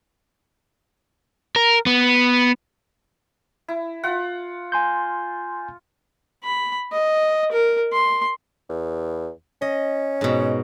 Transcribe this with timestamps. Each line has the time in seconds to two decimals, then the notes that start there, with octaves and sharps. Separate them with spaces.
1.56 A#4
1.86 B3
3.68 E4
4.03 F4 F#5
4.72 G#5 C6 G6
6.44 B5
6.92 D#5
7.52 A#4
7.92 C6
8.69 E2
9.62 C#4 D#5
10.21 G#2 B2